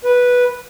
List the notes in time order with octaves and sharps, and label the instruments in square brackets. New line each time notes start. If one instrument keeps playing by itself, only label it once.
[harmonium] B4